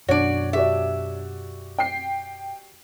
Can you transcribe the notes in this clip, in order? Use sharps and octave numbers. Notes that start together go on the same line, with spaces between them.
F#2 B2 D4 F#4 C#5 D5
F#4 G4 D5 E5
G5 C7